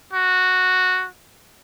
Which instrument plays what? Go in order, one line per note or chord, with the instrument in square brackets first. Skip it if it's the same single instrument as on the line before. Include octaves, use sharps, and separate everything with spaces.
[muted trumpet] F#4